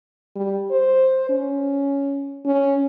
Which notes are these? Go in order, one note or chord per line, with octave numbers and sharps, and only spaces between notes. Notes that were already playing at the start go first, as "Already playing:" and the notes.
G3
C5
C#4
C#4